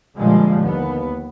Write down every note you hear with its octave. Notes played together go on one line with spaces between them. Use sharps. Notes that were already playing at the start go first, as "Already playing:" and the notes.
A#2 D3 F3 G3 G#3
D#2 B3